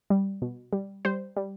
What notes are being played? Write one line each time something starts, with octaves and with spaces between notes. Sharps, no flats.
G3
B2
G3
G3 C5
G3